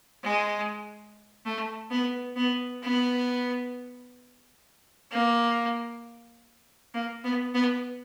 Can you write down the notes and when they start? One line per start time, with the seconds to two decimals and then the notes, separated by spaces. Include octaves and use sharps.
0.23 G#3
1.45 A3
1.91 B3
2.36 B3
2.82 B3
5.11 A#3
6.94 A#3
7.24 B3
7.54 B3